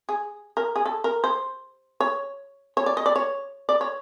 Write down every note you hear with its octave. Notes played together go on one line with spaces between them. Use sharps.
G#4
A#4
G#4
A4
A#4
C5
C#5
C#5
D5
D#5
D5
C#5
D5
C#5